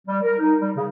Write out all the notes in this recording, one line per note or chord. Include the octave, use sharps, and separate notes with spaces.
G3
A#4
D#4
G3
C#3